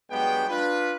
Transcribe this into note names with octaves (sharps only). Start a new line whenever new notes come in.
G2 F#3 G#3 B3 D4 G5
D4 F4 B4